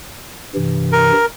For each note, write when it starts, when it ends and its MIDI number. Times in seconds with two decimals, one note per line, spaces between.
0.55 1.12 43
0.55 1.12 48
0.55 1.12 52
0.92 1.26 70